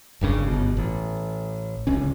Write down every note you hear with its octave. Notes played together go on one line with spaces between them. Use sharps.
F#1 G2 C#3
G1 B2
A1
D1 C#2 C#4